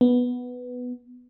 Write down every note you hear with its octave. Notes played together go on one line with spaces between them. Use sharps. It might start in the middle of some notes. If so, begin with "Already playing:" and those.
B3